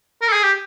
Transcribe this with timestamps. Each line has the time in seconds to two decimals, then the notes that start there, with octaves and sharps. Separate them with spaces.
0.22 A#4
0.28 A4
0.33 G#4
0.43 G4